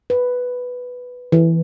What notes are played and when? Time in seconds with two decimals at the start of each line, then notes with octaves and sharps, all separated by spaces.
0.10 B4
1.32 E3